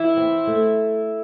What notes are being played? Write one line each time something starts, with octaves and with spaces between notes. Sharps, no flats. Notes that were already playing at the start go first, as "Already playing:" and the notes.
Already playing: E3 E4
C4
A3